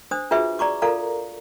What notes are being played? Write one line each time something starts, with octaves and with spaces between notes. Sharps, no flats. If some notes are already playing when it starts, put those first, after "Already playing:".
D4 C5 D#6
D4 F4 F#4 G#4 B4 E5
D5 A#5 C#6 D6
F4 A4 A#4 D5 F5 A#5